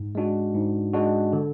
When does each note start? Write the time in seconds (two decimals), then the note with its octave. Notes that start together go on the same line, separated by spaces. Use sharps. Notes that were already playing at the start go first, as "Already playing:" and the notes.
Already playing: G#2
0.15 G#3 D4 F#4
0.54 G#2
0.93 G#3 D4 F#4
1.33 D3